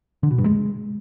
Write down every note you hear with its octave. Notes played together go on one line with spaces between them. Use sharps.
D3
B2
G2
G#3